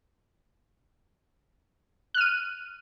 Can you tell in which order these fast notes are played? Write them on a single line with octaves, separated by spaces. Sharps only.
F#6 F6 D#7